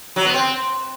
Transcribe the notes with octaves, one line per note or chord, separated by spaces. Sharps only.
F#3
B3
C4